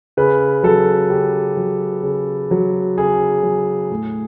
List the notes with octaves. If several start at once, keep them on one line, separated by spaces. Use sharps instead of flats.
C#3 B4
F#3 A4
C#3 G4
F#3
C#3
F#3
C#3 G#4
F#3
A2